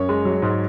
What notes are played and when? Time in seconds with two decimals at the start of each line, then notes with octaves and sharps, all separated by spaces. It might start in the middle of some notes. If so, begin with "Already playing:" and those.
Already playing: F#2 C#5
0.09 G#3
0.25 F#3
0.42 G#2